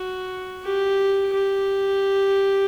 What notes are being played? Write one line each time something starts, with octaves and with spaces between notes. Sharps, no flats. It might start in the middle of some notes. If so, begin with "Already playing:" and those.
Already playing: F#4
G4
G4